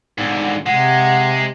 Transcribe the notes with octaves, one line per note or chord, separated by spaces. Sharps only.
G#2 D3
C3 G#3 F#5